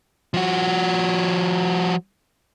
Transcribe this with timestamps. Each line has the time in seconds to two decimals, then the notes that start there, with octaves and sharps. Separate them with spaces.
0.34 F3 F#4